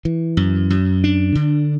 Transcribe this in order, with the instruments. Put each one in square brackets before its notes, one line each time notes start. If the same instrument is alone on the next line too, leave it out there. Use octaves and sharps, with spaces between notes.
[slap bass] E3
F#2
F#2
D4
D3